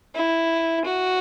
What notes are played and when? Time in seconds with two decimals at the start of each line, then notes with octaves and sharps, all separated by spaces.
0.15 E4
0.85 F#4